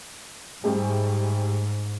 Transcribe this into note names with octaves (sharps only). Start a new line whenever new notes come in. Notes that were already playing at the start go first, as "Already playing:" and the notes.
G#2 G3 A3 G#4